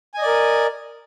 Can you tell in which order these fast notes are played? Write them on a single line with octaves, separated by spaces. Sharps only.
G#5 D#5 D5 A#4